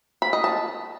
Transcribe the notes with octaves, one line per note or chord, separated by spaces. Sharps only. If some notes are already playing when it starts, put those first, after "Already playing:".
B5
D#5
A5